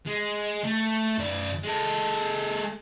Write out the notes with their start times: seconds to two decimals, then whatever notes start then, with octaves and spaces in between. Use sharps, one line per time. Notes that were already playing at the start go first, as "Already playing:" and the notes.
0.07 G#3
0.63 A3
1.18 F#2 D5
1.63 G#3 A4